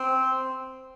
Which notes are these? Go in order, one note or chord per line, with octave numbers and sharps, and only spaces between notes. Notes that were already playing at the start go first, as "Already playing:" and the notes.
Already playing: C4